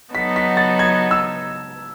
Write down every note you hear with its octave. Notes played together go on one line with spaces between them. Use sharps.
F#3 B3 D#4 A4 B6
B6
A6
G#6
E6